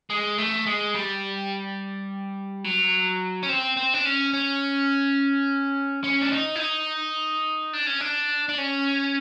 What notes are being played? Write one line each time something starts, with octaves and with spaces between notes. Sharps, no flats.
G#3
A3
G#3
G3
F#3
C#4
C4
C4
D4
C#4
C#4
C#4
D4
D#4
E4
D#4
D4
C#4
D4
D4
C#4